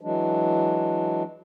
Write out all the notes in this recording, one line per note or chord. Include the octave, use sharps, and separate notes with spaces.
E3 F#3 G#3 D4